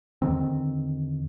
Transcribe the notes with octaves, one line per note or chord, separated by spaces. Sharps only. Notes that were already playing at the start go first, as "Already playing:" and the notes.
E2 D3 D#3 C4